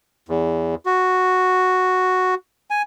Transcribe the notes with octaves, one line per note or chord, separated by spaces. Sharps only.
E2
F#4
G#5